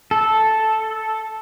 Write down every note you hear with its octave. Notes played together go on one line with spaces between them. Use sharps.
A4